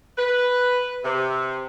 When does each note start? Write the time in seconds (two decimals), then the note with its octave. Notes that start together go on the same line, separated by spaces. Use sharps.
0.17 B4
1.03 C3